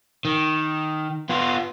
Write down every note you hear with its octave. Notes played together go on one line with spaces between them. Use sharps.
D#3
B3 F4